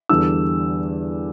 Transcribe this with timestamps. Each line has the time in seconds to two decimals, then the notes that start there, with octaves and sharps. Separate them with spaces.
0.09 E2 D3 G3 D4 E6